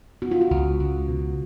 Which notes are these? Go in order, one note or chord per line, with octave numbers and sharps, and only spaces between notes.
B3 F#4
F4
F#4
C#2
C#2
B2